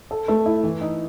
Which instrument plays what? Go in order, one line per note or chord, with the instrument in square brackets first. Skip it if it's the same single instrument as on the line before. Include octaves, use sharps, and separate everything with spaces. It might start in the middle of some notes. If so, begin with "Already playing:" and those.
[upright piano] A4
A3
E4
E3
D#4